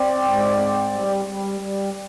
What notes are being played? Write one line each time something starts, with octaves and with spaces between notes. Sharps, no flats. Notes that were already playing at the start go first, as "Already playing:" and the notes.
Already playing: C4 D5
G#2
C4
G3
G3
G3